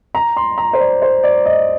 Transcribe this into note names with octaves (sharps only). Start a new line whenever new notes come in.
A#5
C6
A#5
C5
D5
C5
D5
D#5